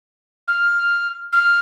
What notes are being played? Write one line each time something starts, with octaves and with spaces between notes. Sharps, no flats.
F6
F6